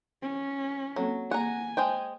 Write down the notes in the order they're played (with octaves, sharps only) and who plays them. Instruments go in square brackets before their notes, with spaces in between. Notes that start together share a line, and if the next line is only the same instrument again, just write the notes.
[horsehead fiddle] C#4
[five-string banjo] F#3 [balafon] A#3 C4 A4
[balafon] A#3 G#4 [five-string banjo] F#5 A#5 [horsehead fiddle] G#5
[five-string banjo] G#3 C5 G5